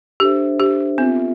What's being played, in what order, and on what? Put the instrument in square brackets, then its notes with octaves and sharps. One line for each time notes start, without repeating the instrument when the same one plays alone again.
[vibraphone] D4 A4 C5 E5 [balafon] G4
[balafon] G4
[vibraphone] B3 F4 A4 E5 [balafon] C4